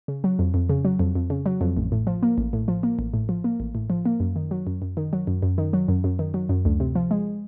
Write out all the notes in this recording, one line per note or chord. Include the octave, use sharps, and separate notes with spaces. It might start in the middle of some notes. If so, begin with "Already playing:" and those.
C#3
F#3
F2
F2
C#3
F#3
F2
F2
C#3
F#3
F2
A1
A2
F3
A#3
A1
A2
F3
A#3
A1
A2
F3
A#3
A1
A2
F3
A#3
F#2
D#3
F#3
F#2
F#2
D#3
F#3
F#2
F#2
D#3
F#3
F#2
F#2
D#3
F#3
F#2
D2
C3
F3
G#3